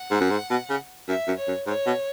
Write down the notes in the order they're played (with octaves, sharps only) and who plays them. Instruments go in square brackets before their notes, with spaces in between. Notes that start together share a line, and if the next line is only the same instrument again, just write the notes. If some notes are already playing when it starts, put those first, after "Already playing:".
Already playing: [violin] F#5
[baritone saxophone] G#2
F#2
G#2
B2
C#3
[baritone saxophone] F#2 [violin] E5
[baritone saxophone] F#2
[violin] C#5
[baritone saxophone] F#2
[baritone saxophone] G#2 [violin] C#5
[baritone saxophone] B2